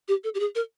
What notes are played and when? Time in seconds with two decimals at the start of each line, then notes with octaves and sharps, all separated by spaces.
0.08 G4
0.24 A4
0.35 G4
0.40 G#4
0.55 A#4